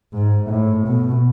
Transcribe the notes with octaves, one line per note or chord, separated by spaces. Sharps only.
G#2
A2
B2